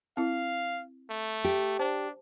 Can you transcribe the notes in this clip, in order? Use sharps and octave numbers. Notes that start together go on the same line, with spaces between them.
C4 E4 F5
A3
G4
D4 C5 A5